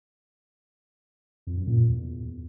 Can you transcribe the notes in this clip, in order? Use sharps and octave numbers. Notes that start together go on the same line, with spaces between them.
F2
F#2
A#2
A#2
E2